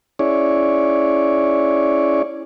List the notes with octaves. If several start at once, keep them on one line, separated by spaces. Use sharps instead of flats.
C#4 E4 G#4 C#5 D5